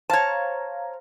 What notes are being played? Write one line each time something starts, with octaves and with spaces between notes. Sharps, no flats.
C5 C#5 F5 A5 A#5